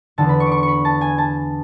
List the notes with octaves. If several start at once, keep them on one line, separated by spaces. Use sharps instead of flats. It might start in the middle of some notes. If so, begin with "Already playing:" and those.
E2 D3 A5
B5
C#6
D6
C#6
B5 C#6
A5
G#5
A5